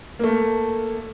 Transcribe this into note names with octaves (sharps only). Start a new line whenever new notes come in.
A3 A#3